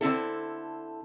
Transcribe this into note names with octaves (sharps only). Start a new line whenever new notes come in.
D3 C4 E4 A4